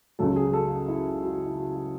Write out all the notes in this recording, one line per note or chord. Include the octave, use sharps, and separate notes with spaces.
C#2 C#3 F#3 A4
G#4
A4
F#4
E4
F#4
E4
F#4
F#4